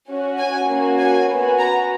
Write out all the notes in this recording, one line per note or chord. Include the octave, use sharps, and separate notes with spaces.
C#4 F#4
G#5
A#3 C#4 F#4
G#5
B3 F#4
A#5